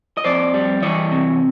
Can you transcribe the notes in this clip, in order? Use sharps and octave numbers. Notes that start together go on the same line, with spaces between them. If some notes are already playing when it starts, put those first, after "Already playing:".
D#5
F2 C5 D5
G3
E3 C#5 D#5
C3